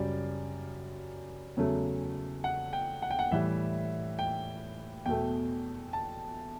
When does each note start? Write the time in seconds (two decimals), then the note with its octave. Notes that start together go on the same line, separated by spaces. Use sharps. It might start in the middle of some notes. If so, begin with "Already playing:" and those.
Already playing: F#2 C#3 G3 D5
1.56 E2 C#3 F#3 A3
2.44 F#5
2.73 G5
3.02 F#5
3.11 G5
3.19 F#5
3.31 A2 E3 G3 E5
4.19 G5
5.06 E2 B2 A3 G5
5.93 A5